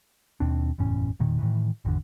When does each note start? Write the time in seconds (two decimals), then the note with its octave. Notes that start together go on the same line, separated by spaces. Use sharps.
0.40 D#2 B2 C4 D4
0.78 F#1 E2 A2 C#4
1.19 E1 A#2 D#3
1.39 A2 D#3 E3
1.85 G#1 E2 D3